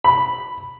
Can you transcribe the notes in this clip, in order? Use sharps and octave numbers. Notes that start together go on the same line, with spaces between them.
B5